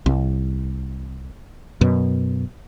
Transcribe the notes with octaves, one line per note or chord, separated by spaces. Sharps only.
C2
F#2 B2